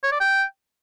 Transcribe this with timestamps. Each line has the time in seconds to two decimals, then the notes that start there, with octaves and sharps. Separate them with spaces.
0.03 C#5
0.12 D5
0.20 G5